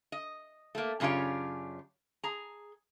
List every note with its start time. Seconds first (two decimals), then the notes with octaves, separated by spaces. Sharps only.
0.12 D#5
0.75 A3 A#3
1.00 F#2 C#3 D4 F4 G4 C#5
2.24 G#4 A#5